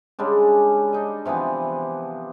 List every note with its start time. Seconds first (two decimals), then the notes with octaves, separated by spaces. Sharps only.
0.19 C#3 G3 G#3 D4
0.93 D4 D#4 D#5
1.25 C3 E3 F3 B3